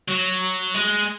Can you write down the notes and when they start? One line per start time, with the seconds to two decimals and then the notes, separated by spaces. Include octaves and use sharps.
0.09 F#3
0.75 G#3